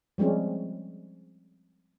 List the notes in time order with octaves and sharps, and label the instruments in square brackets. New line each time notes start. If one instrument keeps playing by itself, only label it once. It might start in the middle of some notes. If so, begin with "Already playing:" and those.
[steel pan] F3 G3 G#3 C4 C#4